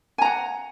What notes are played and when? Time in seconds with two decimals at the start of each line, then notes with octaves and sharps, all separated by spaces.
0.18 G#5
0.22 A#5
0.25 F#5